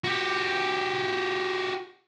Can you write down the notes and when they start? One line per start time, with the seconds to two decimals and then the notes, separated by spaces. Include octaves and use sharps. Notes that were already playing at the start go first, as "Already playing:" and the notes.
0.04 F#4 G4